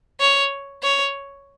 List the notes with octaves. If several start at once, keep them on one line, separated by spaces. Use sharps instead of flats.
C#5
C#5